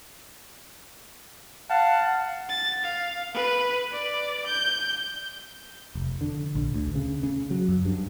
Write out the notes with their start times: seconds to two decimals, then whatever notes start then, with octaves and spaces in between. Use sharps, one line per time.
1.70 F5 F#5 A5
2.49 A6
2.83 F5
3.34 B4
3.91 D5
4.46 G6
5.95 F1
6.21 D3
6.55 A#1
6.74 D2
6.95 C#3
7.23 C#3
7.51 F#3
7.69 F#2
7.85 G2